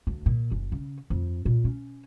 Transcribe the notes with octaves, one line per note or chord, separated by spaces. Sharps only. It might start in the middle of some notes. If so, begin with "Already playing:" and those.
D2
A#2
F#1
C#3
F2
A#2
C#4